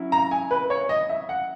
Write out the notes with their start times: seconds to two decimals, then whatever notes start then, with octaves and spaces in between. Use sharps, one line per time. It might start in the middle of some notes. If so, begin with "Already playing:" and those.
Already playing: F#3 C#4 E4
0.12 A#5
0.31 G#5
0.51 B4
0.70 C#5
0.89 D#5
1.09 E5
1.29 F#5